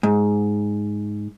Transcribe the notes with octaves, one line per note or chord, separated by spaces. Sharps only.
G#2